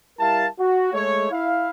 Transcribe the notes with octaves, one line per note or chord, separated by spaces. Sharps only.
G3 E4 A#4 F5 A5
F#4
G#3 A3 C#5
E4 F5